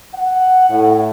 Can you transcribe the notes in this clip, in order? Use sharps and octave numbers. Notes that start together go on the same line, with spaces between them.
F#5
A2